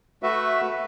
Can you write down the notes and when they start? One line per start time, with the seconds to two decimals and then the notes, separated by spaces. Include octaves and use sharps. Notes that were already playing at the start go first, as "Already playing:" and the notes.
0.23 A3 F#4 B4 E5